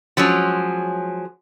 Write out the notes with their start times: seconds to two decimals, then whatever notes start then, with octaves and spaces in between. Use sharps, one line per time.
0.17 F3 F#3 G#3 C#4